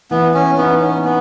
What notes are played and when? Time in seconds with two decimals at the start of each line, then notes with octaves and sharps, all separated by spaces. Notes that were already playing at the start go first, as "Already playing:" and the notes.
0.11 E3 B3
0.34 C#4
0.57 B3 D#4
0.82 C#4
1.05 B3